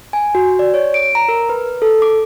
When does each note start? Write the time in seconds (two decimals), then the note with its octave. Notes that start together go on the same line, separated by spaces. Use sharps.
0.13 G#5
0.35 F#4
0.59 D5
0.74 C#5
0.94 D7
1.15 A#5
1.29 A#4
1.49 B4
1.82 A4
2.02 D6